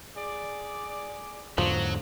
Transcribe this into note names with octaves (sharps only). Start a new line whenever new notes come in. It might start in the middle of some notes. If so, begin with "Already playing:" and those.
G#4 D5
E2 G#2 D3 F3 F#3